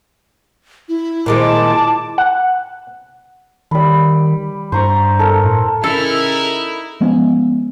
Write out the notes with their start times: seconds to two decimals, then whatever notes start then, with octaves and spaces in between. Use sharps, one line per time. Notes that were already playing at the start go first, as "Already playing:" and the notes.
0.88 E4
1.26 A#2 D#3 G#3 A5 D6
2.18 F#5
3.71 D#3 G3 B5
4.72 G2 C5 A#5 C#6
5.19 A4 A#4
5.45 A2
5.84 C#3 D#4 E4 A4 A#4 F6
7.01 F3 G#3 B3 C#4